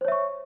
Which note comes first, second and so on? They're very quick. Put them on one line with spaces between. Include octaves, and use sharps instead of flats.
C5 C#5 E5 C#6